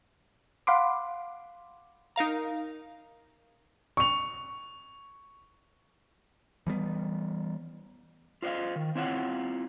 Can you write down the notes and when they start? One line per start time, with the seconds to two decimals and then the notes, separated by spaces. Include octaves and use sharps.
0.67 F5 F#5 B5 C6 D6
2.16 D#4 A#4 F5 A#5
3.97 C#6 F7
6.67 E3 G3 G#3 B3
8.42 F4 C5 C#5 D#5 F5
8.76 D#3
8.95 C4 E4 F4 C#5 F#5